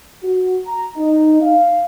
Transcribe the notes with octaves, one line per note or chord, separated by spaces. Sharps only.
F#4
A#5
D#4
F5